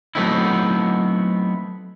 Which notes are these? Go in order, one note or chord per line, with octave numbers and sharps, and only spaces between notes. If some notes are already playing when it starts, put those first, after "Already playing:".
F#3 A3 B3 C4 D#4 E4